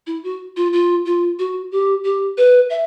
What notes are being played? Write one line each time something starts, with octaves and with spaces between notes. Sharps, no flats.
E4
F#4
F4
F4
F4
F#4
G4
G4
B4
E5